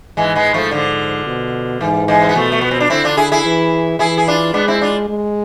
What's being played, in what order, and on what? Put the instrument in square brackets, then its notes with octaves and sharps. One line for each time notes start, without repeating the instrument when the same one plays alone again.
[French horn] G#2 [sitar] E3 G#3
[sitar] G#3 B3
F3 A3
D3 F3
[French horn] B2
[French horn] G#2 [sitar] E3
[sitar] E3 G#3
C4
B3
[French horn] B2 [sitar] F3 A3
[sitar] A3
B3
C4
D4
[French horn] D3 [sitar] C4 E4
[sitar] D4 F4
E4 G#4
E4 G#4
[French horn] E3
[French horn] E3 [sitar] E4 G#4
[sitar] G#4
D4 F4
[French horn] G#3 [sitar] B3 D4
[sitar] C4 E4
D4 F4
[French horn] G#3